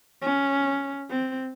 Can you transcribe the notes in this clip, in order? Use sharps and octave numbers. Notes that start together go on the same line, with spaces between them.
C#4
C4